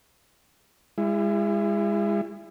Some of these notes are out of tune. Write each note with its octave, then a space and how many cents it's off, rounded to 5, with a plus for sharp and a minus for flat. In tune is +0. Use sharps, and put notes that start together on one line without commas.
G#3 -30 E4 +30